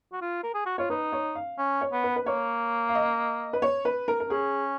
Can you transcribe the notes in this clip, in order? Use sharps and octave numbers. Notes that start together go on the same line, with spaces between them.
F#4
F4
A#4
G#4
F#4
F4 C#5
D#4 B4
C#5
F5
C#4
C#5
B3
B4
B4
A#3 C#5
F5
D#5
B4
C#5
B4
A#4
A#4
C#4 G#4